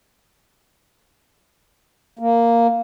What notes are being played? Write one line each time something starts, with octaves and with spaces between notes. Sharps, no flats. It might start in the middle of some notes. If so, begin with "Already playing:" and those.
A#3